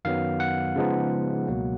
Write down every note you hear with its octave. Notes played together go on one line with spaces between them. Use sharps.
F#2 D#3 F#3 B3 F5
F#5
C#3 F3 G#3 B3 D#4
C#2 B2 F#3 A#3